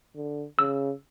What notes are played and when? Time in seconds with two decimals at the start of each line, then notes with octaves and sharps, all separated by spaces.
0.16 D3
0.59 C#3 E6